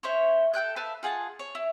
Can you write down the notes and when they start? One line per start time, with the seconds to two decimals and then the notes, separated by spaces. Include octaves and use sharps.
0.03 C#4 E4 C5 C#5
0.54 A4 G5 F#6 G6
0.76 B4 E5 F5 A5
1.03 F4 G#4 F#5 A5
1.39 C#5
1.55 E4